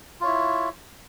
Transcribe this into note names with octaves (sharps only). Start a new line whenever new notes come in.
E4 F4 C#5